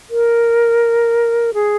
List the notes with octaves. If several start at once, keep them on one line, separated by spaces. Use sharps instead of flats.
A#4
G#4